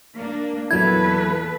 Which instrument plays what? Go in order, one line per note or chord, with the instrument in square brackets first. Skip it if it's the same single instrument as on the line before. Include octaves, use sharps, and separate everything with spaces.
[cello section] A#3 D4
[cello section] E2 A#2 [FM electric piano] F#3 E4 [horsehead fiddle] A4 B4 [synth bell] G#6